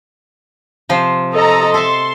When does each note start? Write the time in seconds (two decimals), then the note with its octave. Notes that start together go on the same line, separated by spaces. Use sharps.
0.89 C3 F3 C5
1.34 A4 D#5 A#5
1.74 A4 E5 A5 C6